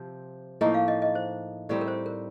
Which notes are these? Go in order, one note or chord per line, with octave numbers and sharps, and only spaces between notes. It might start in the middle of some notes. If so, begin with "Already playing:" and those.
Already playing: C3 F3 C4
A2 F3 A#3 D#4 D#5
F5
D#5
D#5
C5
A2 G3 C4 D#4 D5
A#4
C5
A#4